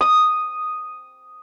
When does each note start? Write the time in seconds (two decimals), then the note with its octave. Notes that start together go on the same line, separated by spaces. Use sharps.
0.01 D#6